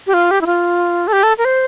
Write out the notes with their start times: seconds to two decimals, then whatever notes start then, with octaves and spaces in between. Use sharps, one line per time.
0.07 G4
0.14 F4
0.31 G4
0.41 E4
0.46 F4
1.08 A4
1.13 G4
1.23 A4
1.38 A#4
1.45 C5